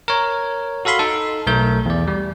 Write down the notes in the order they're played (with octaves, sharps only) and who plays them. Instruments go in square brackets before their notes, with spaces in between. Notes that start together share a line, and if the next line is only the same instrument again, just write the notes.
[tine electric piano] A#4 C#5
F#4 A4 F5 B5 C6
D#4 A4
B1 A3 A#4 G6
E2 D5
G3